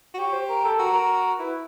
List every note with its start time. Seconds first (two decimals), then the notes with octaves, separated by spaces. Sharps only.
0.14 F#4
0.19 G4 C#5
0.33 C5
0.49 A#4
0.64 A4
0.79 F#4 A#4
0.94 A#4
1.39 E4 B4